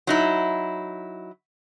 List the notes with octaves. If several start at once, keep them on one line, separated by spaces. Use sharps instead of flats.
F#3 D#4 E4